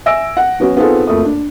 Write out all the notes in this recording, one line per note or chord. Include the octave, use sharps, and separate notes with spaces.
E5 G#5 E6 A#6 D7
F#5
F#3 B3 C#4 F#4
B3 C4 D#4 F4 G#4 A4
F#1 F2 A3 A4 D#6
D4